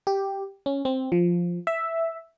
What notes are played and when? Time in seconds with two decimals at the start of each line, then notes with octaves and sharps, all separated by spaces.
0.07 G4
0.66 C#4
0.85 C4
1.12 F3
1.67 E5